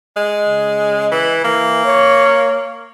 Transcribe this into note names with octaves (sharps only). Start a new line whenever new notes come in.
G#3
C#3
E3
E3 A#3
C#5